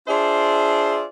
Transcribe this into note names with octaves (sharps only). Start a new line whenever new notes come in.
D4 F4 G#4 C5 D5 E5